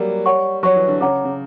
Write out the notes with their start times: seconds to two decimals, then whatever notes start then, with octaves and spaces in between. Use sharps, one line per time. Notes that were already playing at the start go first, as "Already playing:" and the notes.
Already playing: F#3 G3 A#3
0.26 C#5 F#5 C#6
0.63 F#3 C#5 F#5 C#6
0.76 E3
0.88 D3
1.01 C#3 C#5 F#5 A#5 D6
1.25 C#3